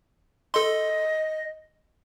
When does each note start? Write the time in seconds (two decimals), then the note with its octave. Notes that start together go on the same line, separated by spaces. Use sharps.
0.54 A4 D#5 C6